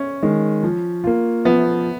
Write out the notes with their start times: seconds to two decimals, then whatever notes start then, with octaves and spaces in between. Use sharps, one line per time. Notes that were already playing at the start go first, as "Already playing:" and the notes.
Already playing: C#4
0.23 D#3 G#3
0.63 F3
1.04 A#3 F4
1.45 F3 B3